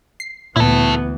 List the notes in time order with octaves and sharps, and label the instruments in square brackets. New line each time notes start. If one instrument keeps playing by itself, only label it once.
[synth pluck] C7
[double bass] D2 E3 [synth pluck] A#2 [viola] B3 [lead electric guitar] E4 A4